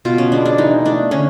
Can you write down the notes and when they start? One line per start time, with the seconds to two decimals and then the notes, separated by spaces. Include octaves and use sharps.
0.05 B2 F4
0.18 C#4
0.32 G#3 B3 D4
0.45 D4
0.58 E3 D#4
0.85 A3 D4
1.11 D3 C#4